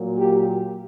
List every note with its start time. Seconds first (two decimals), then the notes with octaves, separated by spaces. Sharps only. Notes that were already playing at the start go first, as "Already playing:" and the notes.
Already playing: A#2 F#3 A#3
0.16 G4